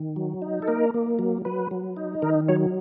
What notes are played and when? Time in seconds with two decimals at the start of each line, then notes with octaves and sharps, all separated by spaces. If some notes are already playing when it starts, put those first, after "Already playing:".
Already playing: D#3
0.16 F#3
0.42 D#4
0.62 A4
0.68 A#3 A#4
0.94 A#3
1.19 F#3
1.45 F#3 B4
1.71 F#3
1.97 D#4
2.22 D#3 A#4
2.48 F#3 C#5